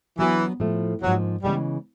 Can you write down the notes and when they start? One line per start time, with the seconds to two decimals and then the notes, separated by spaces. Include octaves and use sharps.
0.19 E3 F#3 B3 D4 F#4 B4
0.60 A2 F3 A3
1.02 G#2 F3 F#3 A#3
1.43 C#3 E3 G3 G#3 B3